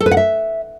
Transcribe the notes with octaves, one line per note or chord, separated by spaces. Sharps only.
A4
B4
F#5
E5